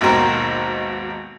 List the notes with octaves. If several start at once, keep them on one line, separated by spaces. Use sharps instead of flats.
G#1 D#2 B2 F#4 A#4 C5